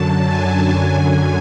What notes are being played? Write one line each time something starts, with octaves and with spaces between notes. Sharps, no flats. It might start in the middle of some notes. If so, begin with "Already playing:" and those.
Already playing: F#2 D3 F#3 A5
G#5
F#2 D3 F#3 G#5